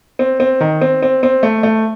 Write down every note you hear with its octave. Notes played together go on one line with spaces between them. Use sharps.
C4
C4
D#3
C4
C4
C4
A3
A3